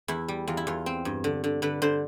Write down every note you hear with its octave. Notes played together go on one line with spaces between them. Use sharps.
E2 E4
G3
E2 F4
E4
E2 F4
C4
G2
D3
D3
D3 B4
D3 C5